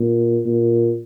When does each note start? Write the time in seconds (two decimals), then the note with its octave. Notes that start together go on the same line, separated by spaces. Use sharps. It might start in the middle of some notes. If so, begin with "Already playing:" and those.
Already playing: A#2
0.46 A#2